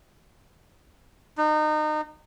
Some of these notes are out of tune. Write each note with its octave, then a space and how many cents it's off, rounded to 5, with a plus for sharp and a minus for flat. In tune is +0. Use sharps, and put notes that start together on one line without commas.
D#4 -30